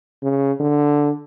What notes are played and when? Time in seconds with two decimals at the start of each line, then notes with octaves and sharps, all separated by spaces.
0.23 C#3
0.60 D3